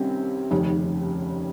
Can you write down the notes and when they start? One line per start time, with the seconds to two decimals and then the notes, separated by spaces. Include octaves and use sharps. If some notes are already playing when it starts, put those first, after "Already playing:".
Already playing: C2 C3 D#3 C4 C#4
0.51 F1 D#2 C#3 C#4